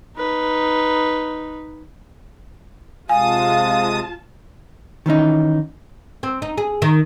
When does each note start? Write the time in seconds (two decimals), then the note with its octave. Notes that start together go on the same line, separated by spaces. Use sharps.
0.17 D#4 B4
3.09 C3 G#3 F4 F5 G#5 A5 D#6
5.06 D#3 E3 C#4 D#4
6.23 C4
6.42 D#4
6.58 G#4
6.82 D#3